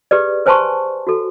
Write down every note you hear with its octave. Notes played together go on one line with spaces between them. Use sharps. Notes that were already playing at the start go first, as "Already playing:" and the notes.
G4 G#4 B4 D5
B4 C5 G#5 A5 C6 C#6
F#4 A4